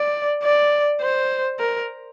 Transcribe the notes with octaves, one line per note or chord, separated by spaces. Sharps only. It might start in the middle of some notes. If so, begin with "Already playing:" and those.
Already playing: D5
D5
C5
A#4